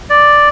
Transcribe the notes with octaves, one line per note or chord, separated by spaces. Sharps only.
D5